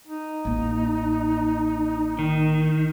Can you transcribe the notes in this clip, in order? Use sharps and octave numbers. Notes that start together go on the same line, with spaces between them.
D#4
A1 A#3
D#3